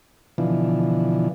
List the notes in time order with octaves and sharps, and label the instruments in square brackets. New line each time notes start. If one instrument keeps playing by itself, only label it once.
[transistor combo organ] B2 D3 E3 F3